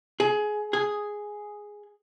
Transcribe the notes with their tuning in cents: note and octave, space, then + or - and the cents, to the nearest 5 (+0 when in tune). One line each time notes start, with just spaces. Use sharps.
G#4 +20
G#4 +0